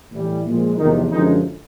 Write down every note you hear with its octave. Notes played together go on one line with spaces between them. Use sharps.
A2 E3 G3
A#2 F3 G#3
E2 C3 D#3 F3 G#3 D#4
F#2 D3 D#3 F3 G#3 D#4